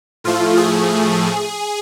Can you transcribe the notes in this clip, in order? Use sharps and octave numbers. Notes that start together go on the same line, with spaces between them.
A2 F3 A3 F4
G#4